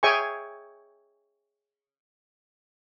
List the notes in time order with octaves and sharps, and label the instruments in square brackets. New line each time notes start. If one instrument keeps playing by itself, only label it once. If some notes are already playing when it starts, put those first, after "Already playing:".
[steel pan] G#4 C#5 E5 G5 G#5 C#6